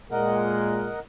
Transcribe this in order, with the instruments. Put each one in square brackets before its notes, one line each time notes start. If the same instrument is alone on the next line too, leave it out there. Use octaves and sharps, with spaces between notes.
[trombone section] A#2 G#3 [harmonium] A#4 D#5 F#5